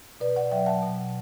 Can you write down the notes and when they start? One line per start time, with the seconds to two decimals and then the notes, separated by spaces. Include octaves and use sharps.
0.20 B2 B4 D5
0.36 D5 F#5
0.51 F#3 E5 G5
0.66 F#5 A5
0.82 B2